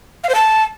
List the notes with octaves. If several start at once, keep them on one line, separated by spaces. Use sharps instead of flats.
F5
C5
A5